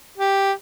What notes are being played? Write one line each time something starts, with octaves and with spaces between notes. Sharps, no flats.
G4